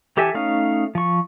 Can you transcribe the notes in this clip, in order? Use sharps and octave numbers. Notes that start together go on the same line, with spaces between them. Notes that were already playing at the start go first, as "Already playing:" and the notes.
E3 G4 A4 E5 G#5
A3 C#4 D#4 F5
F3 C#6